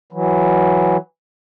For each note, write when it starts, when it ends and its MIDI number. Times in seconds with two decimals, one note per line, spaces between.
0.13 0.97 52
0.13 0.97 54